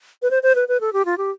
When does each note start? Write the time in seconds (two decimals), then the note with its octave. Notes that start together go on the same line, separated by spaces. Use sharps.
0.22 B4
0.31 C5
0.43 C5
0.55 B4
0.68 B4
0.81 A4
0.93 G4
1.05 F4
1.18 G4